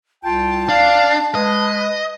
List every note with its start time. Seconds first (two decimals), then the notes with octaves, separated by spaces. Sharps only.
0.24 C2 F4 G5 A5
0.69 D4 F5
1.35 G#3 B4 D#5